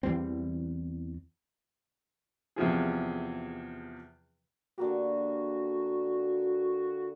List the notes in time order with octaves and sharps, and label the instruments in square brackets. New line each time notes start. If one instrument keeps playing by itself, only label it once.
[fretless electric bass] E2 E3 G3 C4
[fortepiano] E2 C3 F3 G#4
[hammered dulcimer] D3 A#3 G4 [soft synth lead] F#4